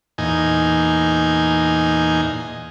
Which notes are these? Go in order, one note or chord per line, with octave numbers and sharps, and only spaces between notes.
E2 A#2 D#4 G#5